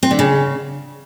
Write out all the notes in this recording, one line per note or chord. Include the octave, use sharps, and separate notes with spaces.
C4
D3
C#3